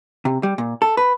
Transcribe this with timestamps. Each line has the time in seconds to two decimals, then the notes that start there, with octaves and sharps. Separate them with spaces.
0.25 C3
0.43 G3
0.58 A#2
0.82 A4
0.97 B4